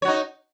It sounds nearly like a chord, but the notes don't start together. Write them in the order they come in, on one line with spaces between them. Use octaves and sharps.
C#5 F#4 D#4